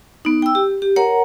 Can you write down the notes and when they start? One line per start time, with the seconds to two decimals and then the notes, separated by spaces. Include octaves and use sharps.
0.25 B3 D#4
0.42 G5 E6
0.55 G4
0.82 G4
0.96 A#4 C#5 F#5 A#5